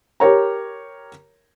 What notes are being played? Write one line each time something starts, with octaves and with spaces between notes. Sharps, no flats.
G4 A#4 C#5 A#5